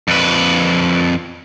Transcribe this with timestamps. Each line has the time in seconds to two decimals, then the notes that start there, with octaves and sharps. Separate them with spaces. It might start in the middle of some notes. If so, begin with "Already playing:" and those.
0.08 F2 B4